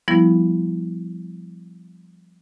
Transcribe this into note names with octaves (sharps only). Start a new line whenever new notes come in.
F3 G3 B3 E4